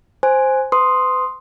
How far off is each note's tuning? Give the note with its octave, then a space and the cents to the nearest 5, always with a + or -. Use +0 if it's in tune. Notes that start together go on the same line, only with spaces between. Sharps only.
C5 +0 G#5 +0
B4 +40 C6 +0 D#6 +0